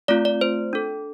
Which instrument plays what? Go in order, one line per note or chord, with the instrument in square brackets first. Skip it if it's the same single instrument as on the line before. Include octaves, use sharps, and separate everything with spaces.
[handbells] A3 C4 F4 D5
D5
C5
D4 A4